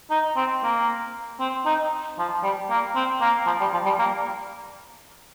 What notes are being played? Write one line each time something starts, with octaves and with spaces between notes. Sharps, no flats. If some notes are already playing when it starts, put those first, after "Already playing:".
D#4
C4
A#3
C4
D#4
F3
G3
A#3
C4
A#3
F3
G3
F3
G3
A#3